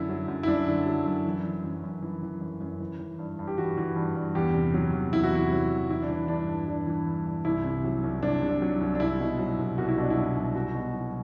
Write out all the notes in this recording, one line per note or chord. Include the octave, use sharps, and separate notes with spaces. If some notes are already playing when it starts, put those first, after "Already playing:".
Already playing: F#2 D3 E4
F#3
F#2
E4
F#2 D4
D3
F#3
F#2
E3
E3
F#2
F#2
E3
E3
F#2
F#2
E3
E3
G2
G2
G4
E3 F#4
E3
G2
G2
E2 G4
C3
F#3
E2
E2 E4
F#4
C3 E4
F#3
E2
E3 E4
D4
E3
G2 D4
G2
E3 D4
E3
G2
G2
C2 E4
C3
F#3
C2
C2 D4
C3
D4
F#3
C2
D4
C2 E4
B2
F#3
C2
C2 F#4
E4
B2 D4
E4
F#3
C2
C2 F#4
B2
F#3